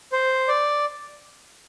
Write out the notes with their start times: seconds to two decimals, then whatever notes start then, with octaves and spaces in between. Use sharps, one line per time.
0.12 C5
0.48 D5